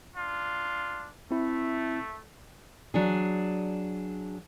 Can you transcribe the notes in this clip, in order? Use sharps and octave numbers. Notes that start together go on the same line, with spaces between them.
D4 F4
A3 C4 E4
F#3 D4 G#4